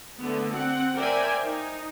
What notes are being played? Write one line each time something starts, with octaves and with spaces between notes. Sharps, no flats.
D3 A3 B3
C4 F#5
A#4 C5 D5 E5 G5 G#5
D#4